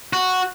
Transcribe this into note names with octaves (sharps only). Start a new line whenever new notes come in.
F#4